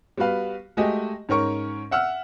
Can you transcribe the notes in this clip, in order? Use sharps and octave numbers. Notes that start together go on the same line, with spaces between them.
G3 B3 F#4 B4 F5
G#3 A3 F#4 G4 D#5 G#5
G#2 C#4 A#4 C#6
E5 F#5 E6 F6